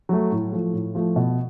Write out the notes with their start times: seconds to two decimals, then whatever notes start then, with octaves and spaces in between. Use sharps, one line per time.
0.09 F#3 A3
0.32 A2
0.52 F3 A3
0.73 A2
0.95 F3 A3
1.16 B2